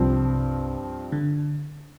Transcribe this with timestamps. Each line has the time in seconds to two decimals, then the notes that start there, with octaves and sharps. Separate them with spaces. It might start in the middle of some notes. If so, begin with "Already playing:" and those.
Already playing: C2 G2 C3 F3 C4
1.12 D3